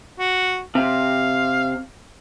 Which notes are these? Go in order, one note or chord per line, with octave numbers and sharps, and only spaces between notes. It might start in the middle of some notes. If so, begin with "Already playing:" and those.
F#4
C3 F5